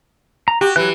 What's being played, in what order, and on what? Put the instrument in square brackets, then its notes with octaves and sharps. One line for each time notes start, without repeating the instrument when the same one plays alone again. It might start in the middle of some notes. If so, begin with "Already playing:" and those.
[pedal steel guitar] A#5
[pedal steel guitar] F#4 [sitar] G4
[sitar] E3 [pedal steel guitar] F#3 F#6